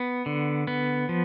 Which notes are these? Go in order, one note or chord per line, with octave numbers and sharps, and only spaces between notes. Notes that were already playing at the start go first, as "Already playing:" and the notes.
Already playing: B3
D3
B3
F3